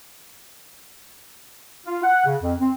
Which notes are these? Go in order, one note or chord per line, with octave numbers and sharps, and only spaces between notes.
F4
F#5
C#3
F2
C4